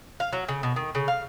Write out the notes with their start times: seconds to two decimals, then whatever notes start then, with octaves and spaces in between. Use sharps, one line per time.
0.20 F5
0.33 F#3
0.48 C#3
0.63 B2
0.76 D#3
0.95 C#3
1.08 F5